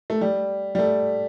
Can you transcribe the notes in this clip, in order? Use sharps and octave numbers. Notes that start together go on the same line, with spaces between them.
A3
G3
G3
A3